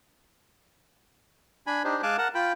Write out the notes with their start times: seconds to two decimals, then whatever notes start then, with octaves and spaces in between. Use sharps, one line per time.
1.67 D4 G#5 B5
1.84 D4 D#4 G4 C5
2.03 G#3 F5 G#5 A5 D6 F#6
2.18 A#4 F#5 A5
2.35 F4 G5 B5